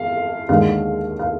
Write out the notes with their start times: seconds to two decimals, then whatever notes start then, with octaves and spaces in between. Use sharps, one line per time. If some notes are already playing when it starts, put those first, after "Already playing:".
Already playing: F5
0.49 D#2 D3 G#3 F5
1.19 F5